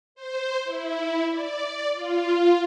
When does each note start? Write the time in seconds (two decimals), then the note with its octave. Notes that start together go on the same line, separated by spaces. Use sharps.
0.15 C5
0.64 E4
1.30 D5
1.94 F4